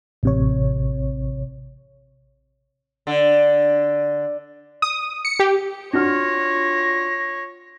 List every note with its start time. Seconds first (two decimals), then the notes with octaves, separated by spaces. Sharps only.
0.23 A1 C3 C#5
3.07 D3
4.82 D#6
5.25 C#7
5.39 G4
5.93 D4 F4 F#4 C#5 F6 A#6